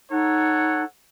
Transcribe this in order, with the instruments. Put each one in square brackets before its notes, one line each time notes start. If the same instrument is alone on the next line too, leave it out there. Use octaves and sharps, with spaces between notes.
[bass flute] D#4 [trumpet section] A4 C#5 F#5